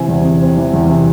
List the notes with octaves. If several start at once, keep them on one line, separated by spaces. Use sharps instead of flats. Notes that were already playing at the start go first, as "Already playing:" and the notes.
Already playing: C3 E3 C4 G#5
E2
C3
C4
E3
E2
C3